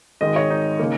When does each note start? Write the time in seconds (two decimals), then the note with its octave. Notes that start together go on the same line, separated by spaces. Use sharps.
0.21 G#1 G#2 D#3 G#3 D#5
0.36 C#5
0.50 D#4
0.79 C#3 A#3